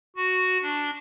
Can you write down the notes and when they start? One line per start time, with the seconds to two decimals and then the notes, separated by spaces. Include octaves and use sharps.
0.16 F#4
0.62 D4